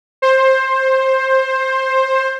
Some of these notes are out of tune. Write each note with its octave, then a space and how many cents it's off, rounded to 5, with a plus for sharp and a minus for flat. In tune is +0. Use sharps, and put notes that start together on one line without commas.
C5 +15